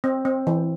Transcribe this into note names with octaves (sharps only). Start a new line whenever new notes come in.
C4
C4
E3